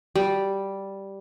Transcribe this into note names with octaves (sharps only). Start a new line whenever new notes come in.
G3